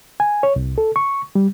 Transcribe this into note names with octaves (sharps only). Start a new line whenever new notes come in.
G#5
C#5
C2
A4
C#6
G3